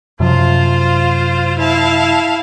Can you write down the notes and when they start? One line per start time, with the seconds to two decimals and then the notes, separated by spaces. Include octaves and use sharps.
0.20 F#2 C3 F3 F4 C5 F5
1.57 E4 F5 A5